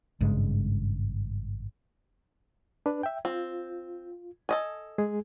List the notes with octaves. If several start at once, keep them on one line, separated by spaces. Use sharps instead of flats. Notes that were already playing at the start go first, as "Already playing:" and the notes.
G#1 G2 C#3 G#3
D4 B4
E5 G5
C4 F4
A4 D#5 G#5
G#3 G#4